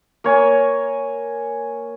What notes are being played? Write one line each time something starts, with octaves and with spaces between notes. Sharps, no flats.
A#3 C#5 G#5